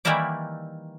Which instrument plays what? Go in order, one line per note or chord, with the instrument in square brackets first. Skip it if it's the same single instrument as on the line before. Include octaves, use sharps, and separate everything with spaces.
[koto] D#3 E3 G3 A#3 E4 D5